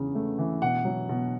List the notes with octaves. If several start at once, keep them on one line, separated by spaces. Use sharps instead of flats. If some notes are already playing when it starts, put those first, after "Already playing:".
Already playing: E2 C#3
A3
E3
B2 F#5
F#3
B2